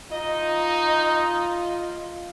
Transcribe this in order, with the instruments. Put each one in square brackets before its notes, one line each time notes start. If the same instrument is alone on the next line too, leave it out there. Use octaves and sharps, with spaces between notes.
[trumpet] D#4 [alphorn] F4 [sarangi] D#5